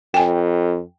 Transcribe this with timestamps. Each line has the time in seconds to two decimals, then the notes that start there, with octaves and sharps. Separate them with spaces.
0.14 F2 G5 G#5